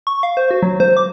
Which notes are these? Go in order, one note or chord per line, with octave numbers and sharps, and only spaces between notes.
C#6
F5
C5
F#4
F#3
C5
D6